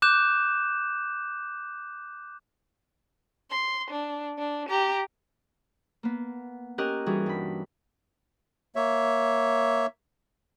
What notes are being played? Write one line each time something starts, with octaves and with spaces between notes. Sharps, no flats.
D6 F#6 G6 E7
C6
D4
D4
G4 A#5
A#3 B3
C#4 G4 A#4 D#5 F#6
E3 G3 D#4 F#4 G#4
G2 B5
A#3 C#5 E5